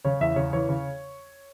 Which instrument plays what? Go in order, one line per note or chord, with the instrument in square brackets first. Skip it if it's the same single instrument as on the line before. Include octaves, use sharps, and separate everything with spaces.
[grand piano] C#3 C#5
E2 E5
C#3 C#5
E3 C#5
C#3